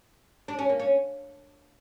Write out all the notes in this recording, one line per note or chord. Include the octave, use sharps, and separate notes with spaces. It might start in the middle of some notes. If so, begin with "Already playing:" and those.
D4
C#4
A#3
C#4